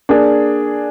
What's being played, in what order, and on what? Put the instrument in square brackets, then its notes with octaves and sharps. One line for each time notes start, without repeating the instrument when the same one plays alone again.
[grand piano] A#3 D4 G#4